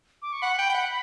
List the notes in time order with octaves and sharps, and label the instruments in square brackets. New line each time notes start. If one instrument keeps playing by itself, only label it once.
[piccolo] D6
C#6
[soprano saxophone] F#5 [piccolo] B5
[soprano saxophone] G5
G5
F#5